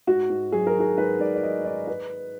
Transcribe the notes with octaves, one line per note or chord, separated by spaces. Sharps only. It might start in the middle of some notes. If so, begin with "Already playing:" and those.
G#2 F#4
G#2
F#3 G#4
A#4
D#3 G#4
G#2 B4
G#2 D5
D5
F#3 D#5
D#3 D5
B4